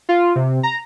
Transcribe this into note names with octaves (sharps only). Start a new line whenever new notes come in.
F4
C3
A#5